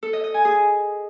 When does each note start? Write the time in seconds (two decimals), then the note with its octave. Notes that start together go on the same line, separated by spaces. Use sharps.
0.03 A4
0.13 D#5
0.24 D#5
0.34 G#5
0.45 G#4